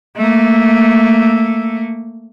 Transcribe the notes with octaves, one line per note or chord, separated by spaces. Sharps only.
A3 A#3